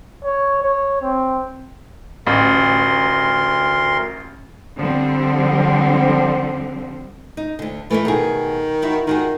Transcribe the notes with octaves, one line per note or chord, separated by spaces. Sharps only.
C#5
C#5
C4
A1 D2 A#4 C6
D3 F3 G3 C4
D#4
D2 D3
E3 A3 A#3 E4
B2 D#3 G4 G#4
D#4 E4 F#4
D#3 F4 F#4 G#4